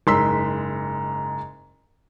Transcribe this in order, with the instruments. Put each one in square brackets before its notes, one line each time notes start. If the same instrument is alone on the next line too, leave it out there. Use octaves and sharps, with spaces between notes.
[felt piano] F#1 G#2 C6 E6 B6